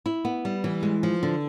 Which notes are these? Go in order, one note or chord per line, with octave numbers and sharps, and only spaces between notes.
E4
B3
G3
E3
G#3
F3
D3